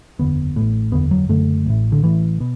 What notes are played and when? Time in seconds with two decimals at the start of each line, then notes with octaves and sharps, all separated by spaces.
0.19 F#1 E2 D3 B3
0.56 A1 A2
0.92 F#1 E2 D3 B3
1.11 F#3
1.29 F#1 F#2 D3 A3
1.66 A1 A2
1.92 D3
2.03 A1 A2 E3
2.40 B2